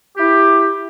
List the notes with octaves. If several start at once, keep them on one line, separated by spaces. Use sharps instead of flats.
E4 G4